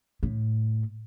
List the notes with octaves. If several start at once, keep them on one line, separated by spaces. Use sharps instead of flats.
A2